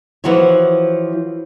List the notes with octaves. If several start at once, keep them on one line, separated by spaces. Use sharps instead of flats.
E3 F3 F#4 C5 C#5